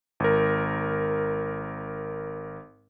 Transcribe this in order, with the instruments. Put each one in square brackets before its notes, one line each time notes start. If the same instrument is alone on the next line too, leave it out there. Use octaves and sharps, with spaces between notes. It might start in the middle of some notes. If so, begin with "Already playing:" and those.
[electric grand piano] G#1 A#4